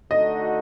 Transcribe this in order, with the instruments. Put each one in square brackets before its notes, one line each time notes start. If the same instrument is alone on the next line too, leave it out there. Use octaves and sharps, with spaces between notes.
[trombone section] D3 A3 D#4 F#4 A4 [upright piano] D#5